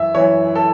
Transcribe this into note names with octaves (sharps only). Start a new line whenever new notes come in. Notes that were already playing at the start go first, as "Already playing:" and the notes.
Already playing: F#2 E3 E5
F#2 E3 C#5
A4